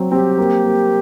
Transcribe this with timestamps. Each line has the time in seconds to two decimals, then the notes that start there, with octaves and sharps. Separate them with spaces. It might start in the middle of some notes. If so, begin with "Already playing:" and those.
Already playing: F#3 C4
0.12 C4 G4
0.38 A#3
0.64 A#3